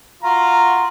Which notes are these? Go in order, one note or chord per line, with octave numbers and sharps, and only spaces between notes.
F4 F#4 A#5 C6